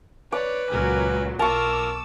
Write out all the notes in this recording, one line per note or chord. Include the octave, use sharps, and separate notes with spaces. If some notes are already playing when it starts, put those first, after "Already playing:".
B4 C#5 D5 D6
C#2 A#2 F#3 A#4 G#5
B1 F4 A#4 A5 C#6 D6 E6